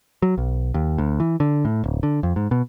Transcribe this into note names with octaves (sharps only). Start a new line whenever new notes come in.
F#3
B1
D#2
D2
E3
D3
A2
D1
D3
F2
G#2
B2